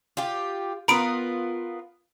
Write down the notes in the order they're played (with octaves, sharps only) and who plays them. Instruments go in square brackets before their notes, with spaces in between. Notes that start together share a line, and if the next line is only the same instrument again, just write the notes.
[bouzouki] F4 G4
[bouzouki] B3 F4 A#4 [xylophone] A#5 B5 D7